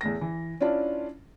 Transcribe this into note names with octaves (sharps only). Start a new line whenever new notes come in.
E2 A2 A#6
E3
C#4 D4 E4 F4 D5 A5